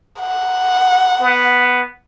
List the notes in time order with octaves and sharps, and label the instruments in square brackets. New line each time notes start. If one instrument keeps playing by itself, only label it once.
[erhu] F#5
[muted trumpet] B3